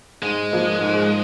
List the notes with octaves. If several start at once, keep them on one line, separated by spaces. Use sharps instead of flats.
G#2 G#3
F3 A#3 D#4
G#2